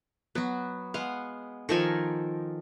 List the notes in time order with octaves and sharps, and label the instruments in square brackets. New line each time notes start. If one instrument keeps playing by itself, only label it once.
[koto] F#3 F#4 [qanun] B3
[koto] G#3 B3 F#5 [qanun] F5
[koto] D#3 A4 G#5 [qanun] F3 A#4 C#6